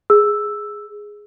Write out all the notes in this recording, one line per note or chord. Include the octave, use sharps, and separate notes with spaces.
G#4 E6